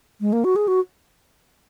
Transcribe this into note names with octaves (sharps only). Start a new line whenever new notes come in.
G#3
A#3
F#4
G#4
F#4